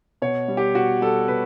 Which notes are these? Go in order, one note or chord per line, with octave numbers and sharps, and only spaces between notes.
B2 C#5
G3
G4
B2 F#4
G3 A4
B2 B4